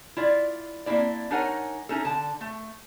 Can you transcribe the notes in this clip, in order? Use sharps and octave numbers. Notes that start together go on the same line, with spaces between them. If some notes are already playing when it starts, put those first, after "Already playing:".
E4 F4 D5
A#3 C4 D4 E4 D5
D4 D#4 A#4 C#5 F#5 G#5
C#4 D#4 E4 A4
D3 A5
A3